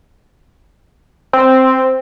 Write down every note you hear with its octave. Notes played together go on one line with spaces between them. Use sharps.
C4